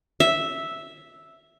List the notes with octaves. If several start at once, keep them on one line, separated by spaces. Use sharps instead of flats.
E5